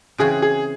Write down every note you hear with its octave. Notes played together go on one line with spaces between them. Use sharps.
C#3 E3 C4 F#4 G#4
G#4